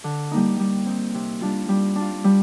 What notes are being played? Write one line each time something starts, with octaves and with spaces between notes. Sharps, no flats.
D3
G3 A#3 D#4
G3
C4 D#4
C3
G3 D4 F4
G3
D4
F4
G3